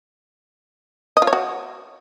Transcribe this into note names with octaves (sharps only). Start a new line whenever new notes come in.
D#5
F4
C#5
F#4